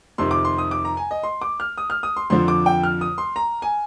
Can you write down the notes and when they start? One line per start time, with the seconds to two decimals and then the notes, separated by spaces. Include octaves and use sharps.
0.18 F2 C3 D#3 C6
0.31 D6
0.45 C6
0.58 D#6
0.71 D6
0.85 A#5
0.97 G#5
1.11 D#5
1.23 C6
1.41 D6
1.60 F6
1.78 D#6
1.90 F6
2.03 D#6
2.16 C6
2.30 F2 D3 F3 C6
2.48 D6
2.66 G5
2.84 F6
3.01 D#6
3.18 C6
3.36 A#5
3.62 G#5